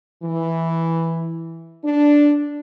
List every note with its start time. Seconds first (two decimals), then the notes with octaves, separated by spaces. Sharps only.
0.23 E3
1.84 D4